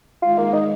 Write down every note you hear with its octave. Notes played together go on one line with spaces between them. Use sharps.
D#3 G#3 F4
A#3
D#4